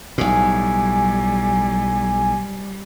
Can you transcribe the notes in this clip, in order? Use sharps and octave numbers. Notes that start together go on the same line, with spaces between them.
B1 A2 G3 G#5